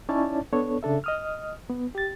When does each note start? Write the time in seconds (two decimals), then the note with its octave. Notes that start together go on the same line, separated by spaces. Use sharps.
0.09 C#4 D#4 E4 C#5 D5 A5
0.53 B3 D4 A4 C#5
0.83 C#3 D4 A4 E5
1.04 D#5 D#6 F6
1.69 B3
1.95 G4 A6